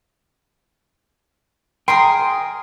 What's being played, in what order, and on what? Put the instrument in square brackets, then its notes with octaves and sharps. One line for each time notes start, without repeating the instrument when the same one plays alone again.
[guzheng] G#4 A#4 G#5 [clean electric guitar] G5 [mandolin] C6